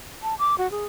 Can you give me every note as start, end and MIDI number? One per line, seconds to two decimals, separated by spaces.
0.23 0.35 81
0.39 0.55 86
0.58 0.70 66
0.71 0.85 68